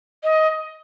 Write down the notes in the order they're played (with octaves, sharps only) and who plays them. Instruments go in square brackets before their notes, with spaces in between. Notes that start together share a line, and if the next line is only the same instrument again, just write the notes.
[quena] D#5